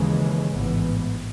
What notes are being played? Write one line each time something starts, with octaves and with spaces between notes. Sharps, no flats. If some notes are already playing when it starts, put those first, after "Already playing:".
Already playing: D#2 C#3 E3 G#3
A1 G#2 E3 B3